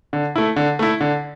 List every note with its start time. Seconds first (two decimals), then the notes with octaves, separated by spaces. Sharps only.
0.13 D3
0.36 A3 E4
0.56 D3
0.79 A3 E4
1.01 D3